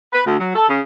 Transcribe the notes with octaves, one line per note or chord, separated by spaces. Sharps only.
B4
D2
F#3
A4
C#3